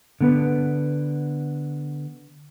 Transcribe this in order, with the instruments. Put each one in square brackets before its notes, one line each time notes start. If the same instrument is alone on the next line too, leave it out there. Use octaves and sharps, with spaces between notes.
[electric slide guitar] D3 B3 B4